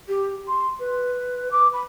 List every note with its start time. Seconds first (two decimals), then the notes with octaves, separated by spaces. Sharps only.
0.08 G4
0.48 C6
0.79 B4
1.51 D6
1.73 B5